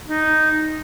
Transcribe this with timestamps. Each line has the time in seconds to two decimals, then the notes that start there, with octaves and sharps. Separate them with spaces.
0.08 D#4